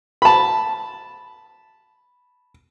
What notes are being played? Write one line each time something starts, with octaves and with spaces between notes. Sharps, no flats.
A5 B5